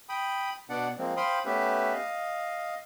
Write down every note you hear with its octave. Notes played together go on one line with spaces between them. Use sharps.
G5 B5 D#6
B2 B3 D4 D5 F#5
F3 G#3 A#3 C4
C5 F5 G5 B5 C6 D#6
A3 B3 C#4 G4 B4 E5
D#5 F5